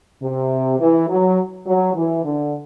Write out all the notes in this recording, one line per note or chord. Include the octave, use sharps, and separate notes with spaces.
C3
E3
F#3
F#3
E3
D3